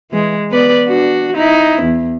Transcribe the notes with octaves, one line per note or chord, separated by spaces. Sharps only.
E3 G#3
B3 B4 D5
D4 F#4
D#4 E4
E2